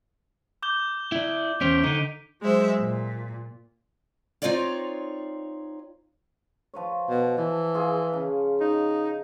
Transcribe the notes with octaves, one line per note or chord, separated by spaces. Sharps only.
D6 G6 G7
E4 D5
E2 C#4 C5 B6 D7 F7
D3 D#4 D#7 G7
F#3 G#3 C5 E5
A#2
C4 D#4 F4 C#5 D5 F5
F3 B4 C#5
B2
E3 A5
F4 G#4
C#3
D#4